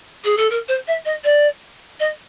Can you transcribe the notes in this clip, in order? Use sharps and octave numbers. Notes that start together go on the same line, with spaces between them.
G#4
A4
A#4
C5
E5
D#5
D5
D#5